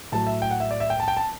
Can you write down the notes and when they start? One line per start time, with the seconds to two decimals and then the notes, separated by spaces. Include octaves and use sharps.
0.12 A2 F#3 A5
0.27 E5
0.42 G5
0.51 F#5
0.60 E5
0.71 D5
0.80 E5
0.90 G5
1.00 A5
1.08 G5
1.17 A5